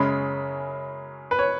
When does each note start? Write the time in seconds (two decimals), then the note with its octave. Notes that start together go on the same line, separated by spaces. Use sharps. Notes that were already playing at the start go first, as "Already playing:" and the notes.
Already playing: F#2 C#3 G#3 C#4 B5
1.31 B4
1.39 C#5